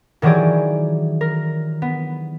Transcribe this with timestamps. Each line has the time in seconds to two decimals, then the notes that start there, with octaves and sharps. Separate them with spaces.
0.22 D#3 E3 F#3 G4 G#4 D5
1.21 A#4
1.82 B3